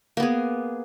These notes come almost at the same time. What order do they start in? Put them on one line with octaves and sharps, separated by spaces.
A#3 B3 G#4